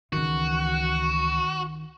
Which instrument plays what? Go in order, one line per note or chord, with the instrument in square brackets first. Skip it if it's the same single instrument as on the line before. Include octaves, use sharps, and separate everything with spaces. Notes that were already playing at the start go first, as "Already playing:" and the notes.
[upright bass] C#2 E3 [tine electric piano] D#3 [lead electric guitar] F#4